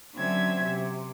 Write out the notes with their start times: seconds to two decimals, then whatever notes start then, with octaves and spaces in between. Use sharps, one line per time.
0.15 D3 F#3 C4 C#4 E5 G#6
0.63 C3